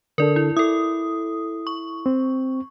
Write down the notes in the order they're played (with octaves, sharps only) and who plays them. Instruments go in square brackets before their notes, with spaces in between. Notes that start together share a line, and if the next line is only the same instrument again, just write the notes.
[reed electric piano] D3 D4 A4 [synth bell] A#4 D5
[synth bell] E4
[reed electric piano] E4 [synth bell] A4 D#6
[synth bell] C#6
[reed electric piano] C4